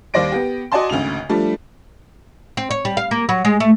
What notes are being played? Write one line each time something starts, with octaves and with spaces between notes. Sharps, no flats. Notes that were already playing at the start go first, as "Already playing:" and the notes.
D#2 G3 C5 D5 A#6 D7
B3 G4
F#4 D5 D#5 G#5 A5 C6
G#1 D2 C#3 F7
F3 G3 A3 D4
C4
C#5
G3
F5
A#3
F#3
G#3
A3